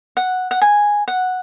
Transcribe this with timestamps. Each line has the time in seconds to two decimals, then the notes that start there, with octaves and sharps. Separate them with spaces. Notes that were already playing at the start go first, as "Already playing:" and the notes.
0.17 F#5
0.51 F#5
0.61 G#5
1.08 F#5